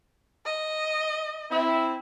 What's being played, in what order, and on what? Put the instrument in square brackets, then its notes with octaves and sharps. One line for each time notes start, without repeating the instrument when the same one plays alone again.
[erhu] D#5
[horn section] C4 E4